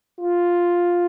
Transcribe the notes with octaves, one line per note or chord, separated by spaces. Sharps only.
F4